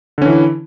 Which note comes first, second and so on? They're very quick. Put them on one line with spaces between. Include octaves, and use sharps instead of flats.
D3 C#4 E3 E4